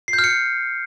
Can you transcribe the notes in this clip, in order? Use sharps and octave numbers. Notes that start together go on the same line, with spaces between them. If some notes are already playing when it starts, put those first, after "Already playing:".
C7
G6
F6
C#7